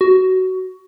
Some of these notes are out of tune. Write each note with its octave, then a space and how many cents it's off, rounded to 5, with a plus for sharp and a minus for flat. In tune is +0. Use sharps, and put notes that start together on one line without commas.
F#4 +15